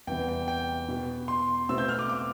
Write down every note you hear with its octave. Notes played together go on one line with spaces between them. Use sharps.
E2 C3 G3 B3 G5
G5
G5
B2 B3
C6
B2 A3 C4 E6
G6
F6
D6
D6